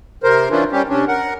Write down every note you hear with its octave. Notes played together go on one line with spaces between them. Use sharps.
C3 A#4 C5
E3 C#4 D4 E4 F4
G3 C#4 G4
C3 C#4 D4
A#4 F#5